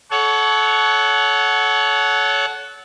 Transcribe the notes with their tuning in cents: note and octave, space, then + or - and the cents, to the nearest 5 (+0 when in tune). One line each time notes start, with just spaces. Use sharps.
A4 -25 C#5 +20 F#5 +0